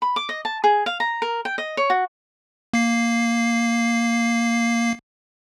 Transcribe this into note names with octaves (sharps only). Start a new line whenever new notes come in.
B5
D6
D#5
A5
G#4
F5
A#5
A#4
G5
D#5
C#5
F#4
A#3 C7